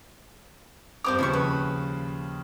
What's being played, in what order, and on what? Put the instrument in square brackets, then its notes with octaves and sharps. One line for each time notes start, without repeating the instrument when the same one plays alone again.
[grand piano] G2 C4 D6 [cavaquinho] A#4 C5 F5
[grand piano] D#2 C#3 F3 [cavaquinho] E4 C5 C#6
[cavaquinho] B4